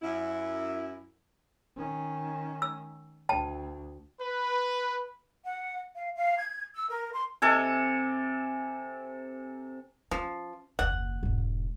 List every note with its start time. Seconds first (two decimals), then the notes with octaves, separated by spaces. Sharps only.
0.02 F#2 E4
1.77 D#3 C#4
2.62 E6
3.29 D2 G5 A5
4.20 B4
5.44 F#5
5.95 F5
6.15 F5
6.38 G#6
6.75 E6
6.88 A#4
7.12 C6
7.42 C3 A4 G#5
10.11 F3 C#4
10.79 F#1 D#2 F#5
11.23 E1 G#2